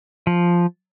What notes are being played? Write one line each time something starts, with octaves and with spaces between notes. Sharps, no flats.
F3